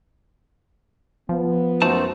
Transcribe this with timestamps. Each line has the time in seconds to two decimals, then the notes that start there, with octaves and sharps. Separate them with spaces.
1.29 F3 B3
1.82 F#2 A3 D#4 F#4 C5 A5